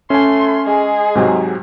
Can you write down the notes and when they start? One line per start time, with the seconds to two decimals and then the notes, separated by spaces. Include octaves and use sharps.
0.10 A3 C#4 G#5 C6
0.66 G#3 G#4
1.15 G#2 C3 F#3